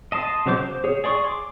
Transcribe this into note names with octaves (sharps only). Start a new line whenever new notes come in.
D#5 A5 C6
C#3 F#3 C5 D6 G6
C5
G#4 C#5
G#4 D5 C6 C#6
C6 D6